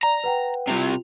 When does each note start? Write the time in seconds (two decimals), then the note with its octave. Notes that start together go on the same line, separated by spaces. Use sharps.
0.03 D5 A#5
0.24 B4 F#5 G5
0.67 C2 C3 F4 F7